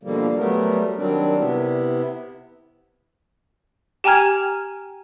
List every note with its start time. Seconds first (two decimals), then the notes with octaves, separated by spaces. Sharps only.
0.03 B2 D3 F3 G3 A#3
0.37 F#3 G3 A3 B3 A#4
0.97 D#3 F#3 G3 C4 D4
1.39 C3 B3 E4
4.04 G4 G5 G#5 A#5 F6 G#6